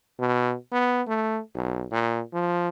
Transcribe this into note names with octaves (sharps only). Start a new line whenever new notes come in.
B2
B3
A3
B1
A#2
F3